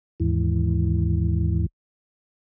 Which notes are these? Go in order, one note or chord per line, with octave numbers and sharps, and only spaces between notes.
D#2 G#2 E3